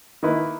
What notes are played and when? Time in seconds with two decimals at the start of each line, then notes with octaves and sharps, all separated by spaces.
0.23 D#3 A#3 E4 B4